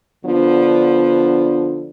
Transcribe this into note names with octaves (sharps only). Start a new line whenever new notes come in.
D3 F3 B3 D4